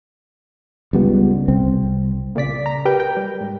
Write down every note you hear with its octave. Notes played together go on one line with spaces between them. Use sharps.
C#2 G3 B3
C2 C4
A#2 C#3 D5 B6
A#5
G4 A#4 B4 G5
G5
G3
G#2